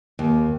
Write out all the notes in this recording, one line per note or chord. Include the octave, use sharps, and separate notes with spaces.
D#2